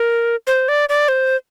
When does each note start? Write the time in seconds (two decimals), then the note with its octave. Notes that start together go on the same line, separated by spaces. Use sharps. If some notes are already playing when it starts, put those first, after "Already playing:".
Already playing: A#4
0.47 C5
0.68 D5
0.89 D5
1.08 C5